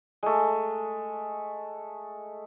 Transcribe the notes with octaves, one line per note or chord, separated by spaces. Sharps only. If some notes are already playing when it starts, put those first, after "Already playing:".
G#3 A3